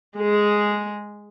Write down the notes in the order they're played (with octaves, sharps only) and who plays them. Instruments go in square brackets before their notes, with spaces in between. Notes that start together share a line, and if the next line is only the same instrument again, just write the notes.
[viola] G#3 G#4